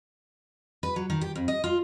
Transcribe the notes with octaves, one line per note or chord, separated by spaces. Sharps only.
B4
F#3
D#3
G4
F2
D#5
F4